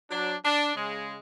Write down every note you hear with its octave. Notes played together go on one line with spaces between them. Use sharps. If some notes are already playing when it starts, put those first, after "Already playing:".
F#3 D4
D4
C#3 G#3